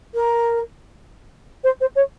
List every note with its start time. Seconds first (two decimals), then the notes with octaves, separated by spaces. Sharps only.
0.14 A#4
1.64 C5
1.80 C5
1.95 C#5